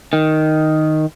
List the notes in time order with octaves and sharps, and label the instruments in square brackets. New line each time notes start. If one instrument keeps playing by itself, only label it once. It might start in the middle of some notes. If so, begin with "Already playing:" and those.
[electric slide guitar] D#3